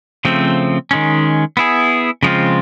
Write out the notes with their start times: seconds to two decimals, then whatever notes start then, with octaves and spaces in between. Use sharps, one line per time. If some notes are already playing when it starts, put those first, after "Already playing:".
0.25 C#3 F3 A3 C4
0.91 D#3 G#3 C#4
1.57 B3 E4 G#4
2.23 C#3 F3 G#3 C4 F4